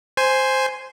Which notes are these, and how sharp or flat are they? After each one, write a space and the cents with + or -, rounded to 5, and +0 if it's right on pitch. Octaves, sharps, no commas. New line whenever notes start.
C5 +0 G#5 +0